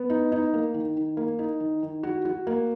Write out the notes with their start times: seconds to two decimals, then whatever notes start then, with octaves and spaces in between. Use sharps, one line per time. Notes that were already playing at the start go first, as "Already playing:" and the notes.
Already playing: B3
0.10 D#4
0.32 D#4
0.54 A#3
0.74 D#3
0.97 D#3
1.17 A#3
1.39 D#4
1.60 D#3
1.83 D#3
2.03 F#4
2.25 F#4
2.47 A#3